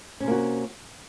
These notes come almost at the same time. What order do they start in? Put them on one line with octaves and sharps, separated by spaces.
C#4 C3 A#3 F#4